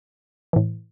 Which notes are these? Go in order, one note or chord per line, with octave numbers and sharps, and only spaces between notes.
A2 E3